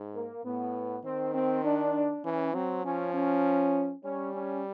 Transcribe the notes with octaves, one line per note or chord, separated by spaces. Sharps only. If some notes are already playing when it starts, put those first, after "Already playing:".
Already playing: G#2
A#3
A2 B3
D#3 C4
C4
D4
E3 C#4
F#3 C4
F3 C#4
C#4
G3 C#4
C#4